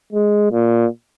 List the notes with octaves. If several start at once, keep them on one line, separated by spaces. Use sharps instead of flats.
G#3
A#2